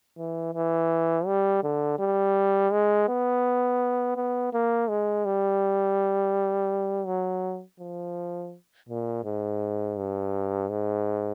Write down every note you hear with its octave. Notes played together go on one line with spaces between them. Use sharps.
E3
E3
G3
D3
G3
G#3
B3
B3
A#3
G#3
G3
F#3
F3
A#2
G#2
G2
G#2